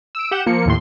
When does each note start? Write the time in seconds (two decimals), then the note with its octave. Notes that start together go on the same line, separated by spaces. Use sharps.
0.15 E6 D7
0.31 G4 F#5 G6 E7
0.46 F3 A#3 C#7
0.66 D#2 A2 C6